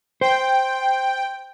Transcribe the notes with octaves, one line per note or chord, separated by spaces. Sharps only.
C5 G5